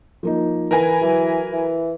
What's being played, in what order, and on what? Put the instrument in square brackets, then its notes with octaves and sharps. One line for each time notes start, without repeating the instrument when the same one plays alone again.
[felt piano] F3 A#3 D#4
[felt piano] E3 [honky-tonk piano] A#4 B4 G#5
[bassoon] E3 [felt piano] F#3
[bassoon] E3